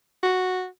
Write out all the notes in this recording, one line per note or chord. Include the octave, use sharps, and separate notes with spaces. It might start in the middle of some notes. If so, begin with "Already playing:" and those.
F#4